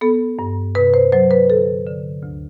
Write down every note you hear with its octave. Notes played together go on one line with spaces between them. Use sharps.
B3 A4
G2
C3 B4
C5
F#3 C5
B4
D3 A4
D3
D2